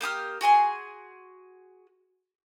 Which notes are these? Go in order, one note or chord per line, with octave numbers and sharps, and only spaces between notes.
A#3 G4 D#6 F6
F#4 G#4 G#5 C6